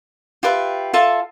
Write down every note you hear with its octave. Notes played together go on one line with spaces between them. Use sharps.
F4 G4 B4 E5
F4 A4 E5 A5